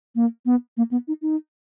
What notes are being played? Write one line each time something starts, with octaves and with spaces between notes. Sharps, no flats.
A#3
B3
A#3
B3
D#4
D#4